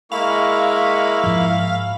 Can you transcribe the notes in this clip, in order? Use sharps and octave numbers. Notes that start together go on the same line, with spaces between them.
G#3 A#3 E4 F5 B5 C#6
G#2 F3